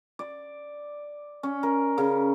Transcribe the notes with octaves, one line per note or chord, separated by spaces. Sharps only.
D5
C#4
A#4
C#3